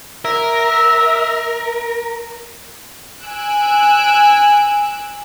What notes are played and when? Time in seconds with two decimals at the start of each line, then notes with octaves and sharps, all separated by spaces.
0.25 A#4 E5
3.21 G#5 E6 F#6 D7